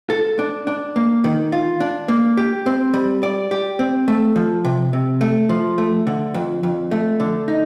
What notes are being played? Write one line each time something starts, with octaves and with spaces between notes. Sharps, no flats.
A4
D4
D4
A#3
D#3
F4
D4
A#3
G4
C4
G3
D5
G4
C4
A3
F3
C3
C3
A3
F3
A3
D3
F2
F2
A3
D3
D#4